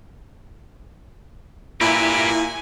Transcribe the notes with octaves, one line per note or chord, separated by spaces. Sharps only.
A#2 E4 G4 B4 G#5